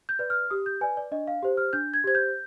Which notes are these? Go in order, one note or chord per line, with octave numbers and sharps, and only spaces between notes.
G6
B4 D5
F6
G4 D#6
G6
B4 D5 G#5
D5
D4 D#5
F5
G4 C5
F6
D4 G6
G#6
G4 C5 G#6
G6